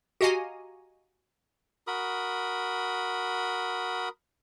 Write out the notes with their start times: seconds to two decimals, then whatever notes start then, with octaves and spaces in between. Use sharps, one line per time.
0.21 F#4 G4 D#5 F5 G#5 A#5
1.87 F#4 A#4 B5 D#6